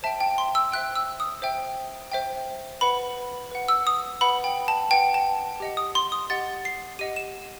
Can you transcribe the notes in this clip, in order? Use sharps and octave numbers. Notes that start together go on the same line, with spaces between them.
C5 E5 G5 A5
G5
C6
E6
C5 E5 G5 F#6
E6
D#6
C5 E5 G5
C5 E5 G5
B4 F#5 B5
B4 F#5
E6
D#6
B4 F#5 B5
G5
A5
B4 F#5 G5
A5
G4 D#5 F#5
D#6
C6
D#6
G4 D#5 F#5 A6
C7
G4 D#5 F#5 D#7
E7